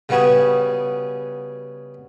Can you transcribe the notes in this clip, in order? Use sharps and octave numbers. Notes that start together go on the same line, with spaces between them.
C#3 G3 B3 F#4 G#4